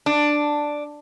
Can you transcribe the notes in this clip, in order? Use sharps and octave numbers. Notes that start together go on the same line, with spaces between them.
D4